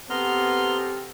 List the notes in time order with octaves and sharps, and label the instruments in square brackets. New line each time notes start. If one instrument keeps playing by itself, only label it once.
[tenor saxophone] B3 [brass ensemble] C4 G4 A4 [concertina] A#5 C6 F6